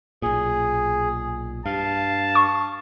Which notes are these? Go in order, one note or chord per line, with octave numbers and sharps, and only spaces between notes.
B1 A#2 G#4
G2 F5 A5
C#6